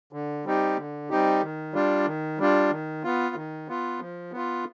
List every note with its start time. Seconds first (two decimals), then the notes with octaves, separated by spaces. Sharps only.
0.13 D3
0.45 G3 C4 D#4 G4
0.77 D3
1.10 G3 C4 D#4 G4
1.42 D#3
1.74 G3 D4 F4
2.07 D#3
2.39 G3 D4 F4
2.71 D#3
3.04 B3 F4
3.36 D#3
3.68 B3 F4
4.00 F3
4.32 B3 F4